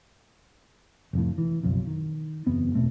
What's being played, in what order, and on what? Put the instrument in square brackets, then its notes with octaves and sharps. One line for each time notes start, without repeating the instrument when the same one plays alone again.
[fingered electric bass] F1 F2 A2
E3
F#1 B1 F2
D#3
F#1 E2 B3 C4
E1 B2 A3 C4